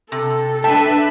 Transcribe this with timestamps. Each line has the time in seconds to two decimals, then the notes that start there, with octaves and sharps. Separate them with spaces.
0.12 C3 A4
0.64 D4 B4 E5 G5 A5